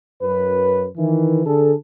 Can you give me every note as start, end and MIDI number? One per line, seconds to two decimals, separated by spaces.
0.22 0.86 42
0.22 0.86 71
0.96 1.46 51
0.96 1.46 52
1.46 1.73 50
1.46 1.73 68
1.46 1.73 69